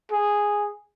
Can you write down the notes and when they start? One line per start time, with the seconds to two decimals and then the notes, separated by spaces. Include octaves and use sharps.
0.12 G#4